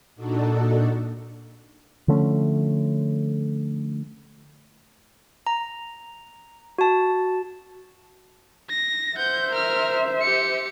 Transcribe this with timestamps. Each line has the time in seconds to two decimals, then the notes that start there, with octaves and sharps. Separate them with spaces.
0.16 A#2 D4 D#4 F#4 A4
2.08 D3 F3 A3 C#4
5.47 A#5
6.78 F#4 A5
8.69 A#6
9.17 C5 E5 F#5 G6
9.51 A#4 F6
10.21 G4 C#7